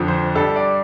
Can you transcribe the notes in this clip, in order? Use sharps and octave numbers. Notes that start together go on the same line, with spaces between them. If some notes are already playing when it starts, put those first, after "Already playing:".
Already playing: F2 D3 F3
C5
G2 G3 A4
D5